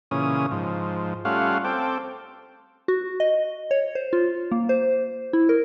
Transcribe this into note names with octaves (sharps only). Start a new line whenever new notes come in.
A#2 C#3 E3 C#4 D#6
G#2 F3
G3 A3 C#4 F4 F5 F#5
C4 A4 G5 D6
F#4
D#5
C#5
C5
F4
A#3
C5
E4
A#4